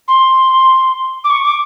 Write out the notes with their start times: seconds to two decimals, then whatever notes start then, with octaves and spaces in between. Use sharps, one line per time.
0.08 C6
1.24 D6
1.29 C#6
1.44 D6